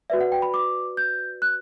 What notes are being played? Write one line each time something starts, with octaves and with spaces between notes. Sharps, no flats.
F#4 B4 D5 E5
F#5
G5
B5
D6
G6
F#6